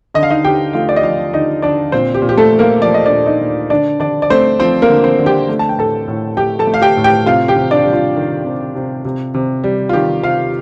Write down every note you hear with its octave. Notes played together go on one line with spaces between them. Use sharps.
D3 D#5
F5
D#4 D#5
D3 G4 G5
A3 F4 F5
D5
D#5
F3 F4 F5
D3 D#4 D#5
D3 D4 D5
A#2 C4 C5
G4
A#2
G4
A3 A4
A3
A#3 A#4
F3 D5
D#5
D4 D5
A#2
D#4 D#5
A#2
D3 D4 D5
D3 D4 D5
D5
A3 C4 C5
F3 C4 C5
A#3 A#4
D3
C4 C5
D3
G4 G5
A3
A5
G5
A2 A4 A5
A2
A3 G4 G5
A4 A5
A3
F5
G4 G5
A2
G4 G5
C3 F4 F5
G4 G5
C3
D4 D5
G3
F4
D#3
C3
C3
C3
C3
G3
F4
D#3 G4
C3 F4 F5